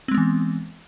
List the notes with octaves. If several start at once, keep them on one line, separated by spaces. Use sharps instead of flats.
E3 G#3 B3 C4